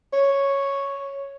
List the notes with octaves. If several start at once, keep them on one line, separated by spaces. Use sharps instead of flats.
C#5